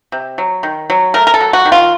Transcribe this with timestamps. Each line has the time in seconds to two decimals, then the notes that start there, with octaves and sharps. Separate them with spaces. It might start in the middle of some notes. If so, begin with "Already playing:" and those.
0.12 C3
0.38 F#3
0.63 D#3
0.90 F#3
1.14 A3 A#4
1.27 A#4
1.34 A4
1.41 F#3
1.53 F#4
1.65 D#3
1.72 F4